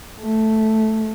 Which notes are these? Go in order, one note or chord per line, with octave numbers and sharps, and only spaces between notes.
A3